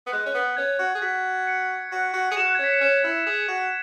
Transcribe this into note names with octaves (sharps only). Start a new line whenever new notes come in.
B3
G#3 F#6
C#4
B3
C#4 G#6
F#4
G#4
F#4 B6
C#7
F#4
F#4
G#4 C#7
F#4 E7
F#6
G#6
C#4 B6
C#7
C#4 E7
E4
C#7
G#4
C#7
F#4